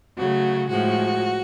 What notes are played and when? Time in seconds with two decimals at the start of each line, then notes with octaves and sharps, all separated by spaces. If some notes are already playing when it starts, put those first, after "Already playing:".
0.17 C#3 F#3 A3 F#4
0.69 A2 F3 G#3 F#4